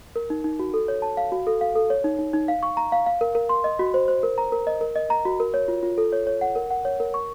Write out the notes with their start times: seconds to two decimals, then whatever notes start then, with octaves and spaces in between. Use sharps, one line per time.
0.16 A#4
0.30 D#4
0.44 D#4
0.59 F#4
0.74 A4
0.88 C#5
1.02 A5
1.17 F5
1.32 F#4
1.47 A4
1.61 F5
1.76 A4
1.90 C#5
2.04 D#4
2.19 D#4
2.34 D#4
2.48 F5
2.63 C#6
2.77 A#5
2.92 F5
3.06 F5
3.21 A#4
3.35 A#4
3.49 C6
3.64 D#5
3.79 F#4
3.94 C5
4.08 C5
4.23 A#4
4.38 A#5
4.52 A#4
4.67 D#5
4.81 A#4
4.96 D#5
5.10 A#5
5.25 F#4
5.40 A#4
5.54 C#5
5.68 F4
5.83 F4
5.98 A4
6.13 C#5
6.27 C#5
6.41 F#5
6.56 A#4
6.71 F#5
6.85 C#5
7.00 A#4
7.14 C#6